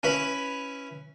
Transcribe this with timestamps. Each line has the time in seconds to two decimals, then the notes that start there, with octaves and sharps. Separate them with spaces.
0.03 C#4 E4 B4 B5